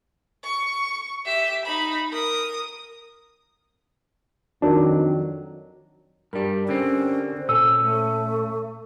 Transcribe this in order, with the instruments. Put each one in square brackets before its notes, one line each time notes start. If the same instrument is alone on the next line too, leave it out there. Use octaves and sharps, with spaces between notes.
[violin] C#6
G4 E5
D#4 B5
A#4 D#6
[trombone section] F2 D#3 [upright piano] F#3 [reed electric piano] D4
[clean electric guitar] G2 G3 [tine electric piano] G4 A#4
[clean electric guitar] D3 C4 [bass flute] C#4
[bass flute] C5
[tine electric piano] A#2 A4 [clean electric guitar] C#4 [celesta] E6
[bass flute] A3